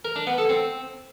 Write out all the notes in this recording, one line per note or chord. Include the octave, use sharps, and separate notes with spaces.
A#4
D4
B3
A4
C4